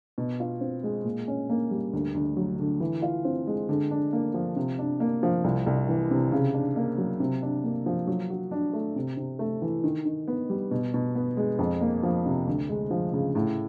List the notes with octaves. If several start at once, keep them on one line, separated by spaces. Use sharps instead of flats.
B2
F4
C4
G#3
A#2
C#4
A#3
G3
D2
D2
F#3
D3
E3
F4
C4
G#3
D3
D4
A#3
F3
C3
D4
A#3
F3
C2
C2
E3
C3
C#3
D4
A#3
F#3
C3
D4
A#3
F3
F#3
F#4
D4
A3
C3
C3
A3
E3
D#3
D#3
B3
G3
B2
B2
B3
G#3
F2
A#3
F3
C3
D2
G#3
F3
C#3
A2